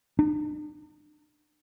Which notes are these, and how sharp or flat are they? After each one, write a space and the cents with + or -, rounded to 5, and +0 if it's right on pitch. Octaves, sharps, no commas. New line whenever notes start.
D4 +45